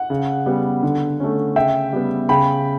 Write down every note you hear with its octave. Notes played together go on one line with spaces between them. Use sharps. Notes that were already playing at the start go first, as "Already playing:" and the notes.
Already playing: F#5
C#3
G3 B3
D3
A3 C#4
C#3 E5 G5
G3 B3
C#3 G5 B5